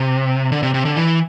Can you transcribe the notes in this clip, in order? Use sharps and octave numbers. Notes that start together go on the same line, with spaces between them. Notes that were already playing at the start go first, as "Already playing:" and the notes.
Already playing: C3
D3
C3
C3
D3
E3